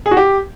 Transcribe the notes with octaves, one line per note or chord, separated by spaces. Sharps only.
G#4
F#4
G4